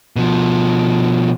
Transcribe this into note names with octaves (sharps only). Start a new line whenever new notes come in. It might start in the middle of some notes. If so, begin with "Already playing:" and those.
B2 F3